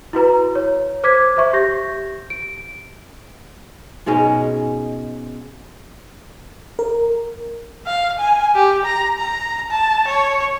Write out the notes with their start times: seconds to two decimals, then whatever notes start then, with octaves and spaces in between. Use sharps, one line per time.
0.13 E4 F#4 B4 A#5
0.55 C#5
1.04 C5 D6 G#6 B6
1.37 C5 E5 C#6
1.53 G4 G6 A#6
2.30 D7
4.06 G#2 B2 G#3 C#4
6.79 A#4
7.86 F5
8.19 G#5
8.55 G4
8.85 A#5
9.19 A#5
9.70 A5
10.08 C#5